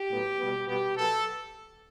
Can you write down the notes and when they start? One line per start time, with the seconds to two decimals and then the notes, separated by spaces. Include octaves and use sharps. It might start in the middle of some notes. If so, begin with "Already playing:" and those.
Already playing: G4
0.11 A2 F#3 B3
0.39 B2 G3 B3
0.67 B2 G3 B3 G4
0.96 B2 F#3 B3 A4